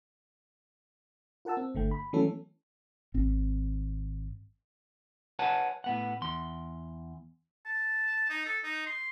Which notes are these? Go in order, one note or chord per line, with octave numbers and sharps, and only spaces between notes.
F4 A#4 F#5 A5 E6
C4
G1 D3 A3 G5
B5
E3 F#3 A3 B3 C#4 A4
G#1 C4
B4 C#5 F#5 G#5 A5
A2 B3 F#5
E2 C6
A5
D#4
A4
D#4
C6